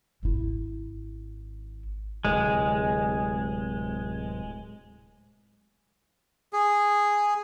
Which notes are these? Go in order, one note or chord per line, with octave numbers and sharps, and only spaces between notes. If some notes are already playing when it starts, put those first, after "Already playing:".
G#1 E4
D1 A2 C3 G#3
G#4